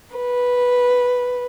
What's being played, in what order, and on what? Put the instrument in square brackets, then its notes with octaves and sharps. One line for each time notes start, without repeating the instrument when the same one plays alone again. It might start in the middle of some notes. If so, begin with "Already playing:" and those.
[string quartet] B4